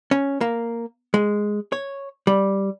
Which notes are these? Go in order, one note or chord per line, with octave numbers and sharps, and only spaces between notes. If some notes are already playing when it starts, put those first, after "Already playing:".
C#4
A#3
G#3
C#5
G3